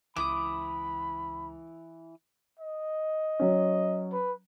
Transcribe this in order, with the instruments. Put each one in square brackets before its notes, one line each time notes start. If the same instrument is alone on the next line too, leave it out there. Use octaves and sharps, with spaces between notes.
[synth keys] C#2 [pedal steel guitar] E3 E4 D#6 [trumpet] B5 [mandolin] D6
[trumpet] D#5
[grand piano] F#3 C#4
[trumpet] B4